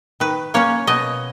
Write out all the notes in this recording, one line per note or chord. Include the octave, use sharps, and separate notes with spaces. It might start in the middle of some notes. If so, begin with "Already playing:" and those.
D#3 B4
A#3 C#4 C#5
B2 D#5